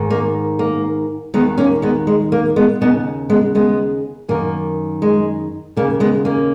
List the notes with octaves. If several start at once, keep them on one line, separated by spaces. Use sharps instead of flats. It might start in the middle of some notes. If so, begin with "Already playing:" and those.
Already playing: G#2 D#3
A#3
A#3
D#2 D#3 G#3 B3
A#3 C#4
G#3 B3
G#3
A#3
G#3 B3
D#2 C#3 B3 D#4
G#3 B3
G#3 B3
F#2 D#3 A#3
G#3
D#2 C#3 A#3
G#3 B3
A#3 C#4